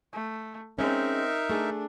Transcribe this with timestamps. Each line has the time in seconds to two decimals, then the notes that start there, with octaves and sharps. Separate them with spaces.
0.13 A3
0.79 G#3 C4 C#4 D#4 A#4 E5
1.50 A3 D4 G#4